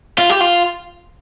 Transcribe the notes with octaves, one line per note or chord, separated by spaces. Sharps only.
F4
G4
F4